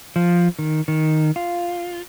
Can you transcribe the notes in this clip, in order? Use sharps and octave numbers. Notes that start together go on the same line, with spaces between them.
F3
D#3
D#3
F4